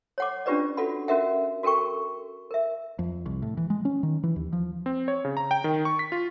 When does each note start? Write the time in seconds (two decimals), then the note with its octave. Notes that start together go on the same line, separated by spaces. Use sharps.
0.18 C#5 F#5 D6
0.46 C#4 D4 F4 G4 B4 D5
0.77 F4 F#4 A4 F#5 B5
1.08 C#4 F#4 A#4 E5 F#5
1.63 F#4 A4 A#4 G5 C#6
2.51 A#4 E5
2.99 F2
3.26 C2
3.42 A2
3.57 E3
3.70 G#3
3.85 C#4
4.03 D#3
4.23 E3
4.36 D#2
4.53 F3
4.86 C4
5.08 C#5
5.25 C#3
5.37 A#5
5.51 G5
5.64 D#3
5.85 C#6
5.99 B6
6.12 F4